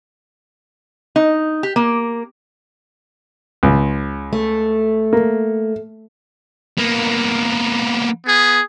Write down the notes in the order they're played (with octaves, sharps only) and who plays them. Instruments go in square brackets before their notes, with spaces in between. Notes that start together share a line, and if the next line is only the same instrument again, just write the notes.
[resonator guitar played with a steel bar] D#4
G4
A#3
[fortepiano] C#2
[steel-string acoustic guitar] A3
[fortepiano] A#3
[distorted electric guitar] A#3 B3
[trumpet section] B3 G#4